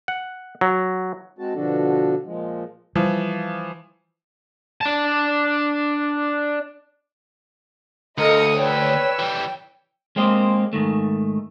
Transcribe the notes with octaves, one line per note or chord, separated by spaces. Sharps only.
F#5
F#3
G#3 C4 F#4 A5
B2 D3 F3 D4 F#4 A4
A#2 F3 G#3
E3 F3 G3
D4 A5
D2 A4 A#4 D#5 F5 D#6 C#7
B4 C#5 D5 G5 E6
E3 G3 G5
G#3 A#3 C4 G4 C5 D#5
G#2 D#3 A3